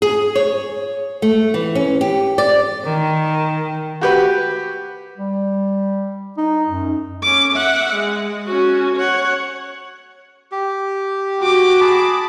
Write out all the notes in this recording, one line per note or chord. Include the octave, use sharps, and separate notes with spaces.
G#4
C#5
A3
E3
C#4
G4
D5
D#3
F#4 G4 B4
G3
D#4
F#2
C#4 D6
E5 F#5
G#3
C#4 F#4
C#5 F#5
G4
F#4 D6
G#4 A5 B5